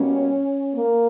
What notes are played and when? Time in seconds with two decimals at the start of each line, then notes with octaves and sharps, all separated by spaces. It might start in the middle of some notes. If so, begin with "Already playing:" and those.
Already playing: B2 G3 A#3 C#4
0.74 A#3